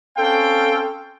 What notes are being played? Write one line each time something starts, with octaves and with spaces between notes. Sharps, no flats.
C4 C#4 A4 F5 G5